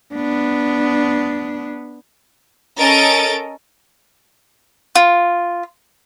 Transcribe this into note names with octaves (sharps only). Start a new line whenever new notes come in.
B3 D4
C#4 A4 A#4 D#5 A6 D7
F4